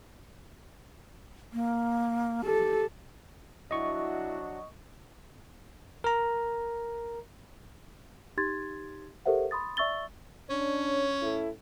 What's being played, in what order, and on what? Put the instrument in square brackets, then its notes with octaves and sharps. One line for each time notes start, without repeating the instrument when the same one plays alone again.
[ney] A#3
[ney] G4 [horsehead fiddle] A4
[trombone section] F#3 D4 F#4 [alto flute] E4 [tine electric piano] D#5 C#6
[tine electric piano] A#4 A#5
[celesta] D#4 G4 C6 G#6 A6
G4 A4 A#4 C5 E5 F#5
B5 C6 D#6 A6
D5 E5 C#6 E6 A6 G7
[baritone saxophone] C#4 [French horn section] D4 C#5
[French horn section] A2 E4 A4